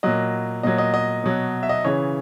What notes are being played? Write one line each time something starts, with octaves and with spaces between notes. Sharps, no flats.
A#2 F#3 D#5
A#2 F#3 D#5
D#5
D#5
B2 F#3
E5
D#5
C#3 E3 C#5